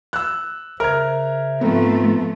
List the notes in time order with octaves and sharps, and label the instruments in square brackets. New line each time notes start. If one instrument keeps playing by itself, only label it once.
[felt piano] E6 F#6
[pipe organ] C#3 C5 E5 [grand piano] A#4 [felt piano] F6 G#6
[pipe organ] G#2 F4 A#5 [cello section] F3 A3 [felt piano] B3 C4 A4